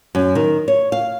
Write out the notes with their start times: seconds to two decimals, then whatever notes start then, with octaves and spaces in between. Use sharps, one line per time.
0.15 F#2
0.35 D#3
0.68 C#5
0.92 F5